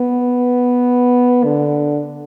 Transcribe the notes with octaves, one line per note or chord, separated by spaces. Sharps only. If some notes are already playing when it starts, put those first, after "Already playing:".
Already playing: B3
D3